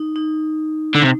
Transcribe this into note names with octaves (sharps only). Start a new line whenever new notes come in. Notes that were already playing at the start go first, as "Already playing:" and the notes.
Already playing: D#4
D#4
D3
C3